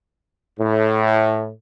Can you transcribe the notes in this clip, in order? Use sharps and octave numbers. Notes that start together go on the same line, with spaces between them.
A2